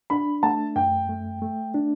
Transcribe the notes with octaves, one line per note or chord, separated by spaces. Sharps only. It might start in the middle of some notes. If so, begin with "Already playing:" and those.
D4 B5
A3 A5
F#2 G5
A3
A3
D4